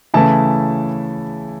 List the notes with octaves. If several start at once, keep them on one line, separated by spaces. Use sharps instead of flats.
C#3 E3 A3 E4 A5